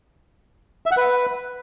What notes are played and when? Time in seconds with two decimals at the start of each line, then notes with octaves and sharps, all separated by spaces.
0.86 E5
0.91 F#5
0.97 B4